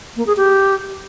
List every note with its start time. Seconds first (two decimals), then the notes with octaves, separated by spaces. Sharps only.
0.16 A#3
0.27 G#4
0.37 G4